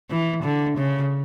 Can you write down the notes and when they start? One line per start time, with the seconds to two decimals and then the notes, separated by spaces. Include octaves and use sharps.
0.10 E3
0.43 D3
0.77 C#3